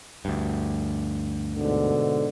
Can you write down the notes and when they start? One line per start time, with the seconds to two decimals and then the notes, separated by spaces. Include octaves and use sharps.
0.25 D2 G2
1.56 G#2 B2 D3